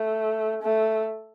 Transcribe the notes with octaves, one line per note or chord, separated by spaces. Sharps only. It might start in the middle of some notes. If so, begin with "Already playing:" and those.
Already playing: A3
A3